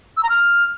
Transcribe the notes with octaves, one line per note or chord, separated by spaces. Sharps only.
E6
A#5
F6